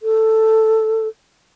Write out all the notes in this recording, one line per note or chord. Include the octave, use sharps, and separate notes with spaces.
A4